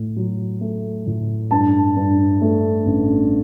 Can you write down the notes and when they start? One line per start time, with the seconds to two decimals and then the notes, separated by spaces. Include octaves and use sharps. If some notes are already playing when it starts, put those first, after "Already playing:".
Already playing: A2
0.16 F#3
0.61 A3
1.06 A2
1.51 G2 A5
1.96 G2
2.42 A3
2.86 A1